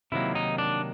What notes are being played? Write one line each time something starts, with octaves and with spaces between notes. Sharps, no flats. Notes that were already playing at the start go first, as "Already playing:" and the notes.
C3 D#3 F#3 A#3 E4
D#4
D4